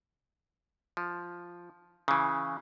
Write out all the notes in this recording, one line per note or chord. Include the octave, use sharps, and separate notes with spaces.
F3
C#3 E3